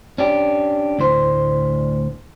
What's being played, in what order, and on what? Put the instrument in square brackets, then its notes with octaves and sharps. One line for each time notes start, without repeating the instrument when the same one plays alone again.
[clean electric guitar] C#4 D4 G4
D2 A2 C5